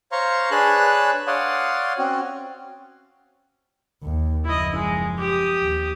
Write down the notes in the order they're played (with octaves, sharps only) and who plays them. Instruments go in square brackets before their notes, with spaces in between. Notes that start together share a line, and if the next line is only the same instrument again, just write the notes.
[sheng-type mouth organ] C5 C#5 F5 A#5 C6 C#6
D4 G#4 B4 C#5 A5 F#6
C#5 D5 F5 F#5 C6 D#6
C4 C#4 F#4
[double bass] D#2
[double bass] F#1 F3 [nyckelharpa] E4 D#5
[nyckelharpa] G#3
G4 D#6
[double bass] D#2